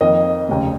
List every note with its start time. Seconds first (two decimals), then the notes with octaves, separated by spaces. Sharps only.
0.01 F2 D#3 A#3 D#5
0.49 F1 D#2 C#3